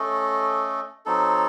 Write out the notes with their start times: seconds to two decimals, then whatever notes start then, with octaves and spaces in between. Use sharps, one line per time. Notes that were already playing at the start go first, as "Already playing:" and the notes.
Already playing: A3 C#4 A4 D#5
1.06 F#3 C4 D#4 A4